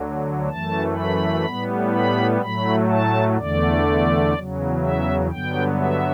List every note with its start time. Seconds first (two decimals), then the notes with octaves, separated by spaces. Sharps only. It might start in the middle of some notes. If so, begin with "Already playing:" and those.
Already playing: D2 D3 F#3
0.49 F#2 E3 A3 A5
0.96 B5
1.45 A2 G3 B3
1.93 B5
2.41 A2 F#3 A3 B5
2.90 A5
3.37 E2 D3 A3 D5
4.34 E2 C#3 F#3
4.82 E5
5.30 G2 D3 F#3 B3 G5
5.78 E5